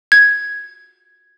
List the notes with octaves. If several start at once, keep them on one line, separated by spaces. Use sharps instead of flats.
G#6